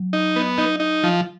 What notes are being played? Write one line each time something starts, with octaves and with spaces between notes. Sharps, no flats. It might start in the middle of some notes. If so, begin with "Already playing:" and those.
Already playing: F#3
D#4
B3
D#4
D#4
F3